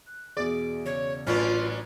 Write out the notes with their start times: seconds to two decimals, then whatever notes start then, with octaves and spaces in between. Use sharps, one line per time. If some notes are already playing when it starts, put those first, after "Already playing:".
0.06 F#6
0.37 E2 B2 G#4 D5
0.86 C#3 C#5
1.27 A1 A#2 F#3 C#4 D4 F4 B4 F6